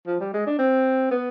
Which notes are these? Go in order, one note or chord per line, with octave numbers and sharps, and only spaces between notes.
F3
G3
G#3
D4
C4
B3